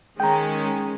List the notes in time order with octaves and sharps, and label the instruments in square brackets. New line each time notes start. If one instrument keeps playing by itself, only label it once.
[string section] D#3 G#3 C#4 [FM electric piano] G5 A#5